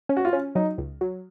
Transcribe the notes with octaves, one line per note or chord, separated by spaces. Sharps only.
C#4
F#4
F4
C#4
F#3 D#4
C#2
F#3